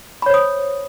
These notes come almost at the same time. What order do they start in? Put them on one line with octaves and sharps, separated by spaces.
B5 C#5 C5 D#6